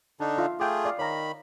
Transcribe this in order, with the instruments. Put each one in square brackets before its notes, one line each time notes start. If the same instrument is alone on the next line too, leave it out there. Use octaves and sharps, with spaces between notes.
[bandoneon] D3 D4 D#4 [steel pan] A5
[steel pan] F4 E5 F5
[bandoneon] A3 F4 G#4 [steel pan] G5 D6
[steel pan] D5 F5
[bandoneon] D#3 B5 [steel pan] C#5 F5 A#5